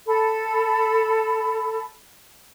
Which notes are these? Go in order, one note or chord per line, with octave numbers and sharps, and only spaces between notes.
A4 B5